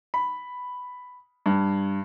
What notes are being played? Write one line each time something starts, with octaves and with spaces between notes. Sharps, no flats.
B5
G2